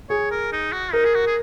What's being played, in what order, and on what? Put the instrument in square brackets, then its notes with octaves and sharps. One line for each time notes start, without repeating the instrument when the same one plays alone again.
[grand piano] G#4 [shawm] C#5
[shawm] A#4
D#4
F#4
[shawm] D#4 [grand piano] A#4
[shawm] G#4
F#4
G#4